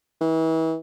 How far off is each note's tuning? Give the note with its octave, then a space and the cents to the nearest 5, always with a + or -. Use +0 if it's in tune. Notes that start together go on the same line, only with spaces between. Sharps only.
E3 -35